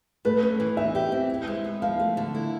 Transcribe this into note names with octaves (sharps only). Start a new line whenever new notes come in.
A3 B4
C#4
E3
D#4 E5
G4
C4
E4
G#3
B3
F3 F5
A3
D3
E4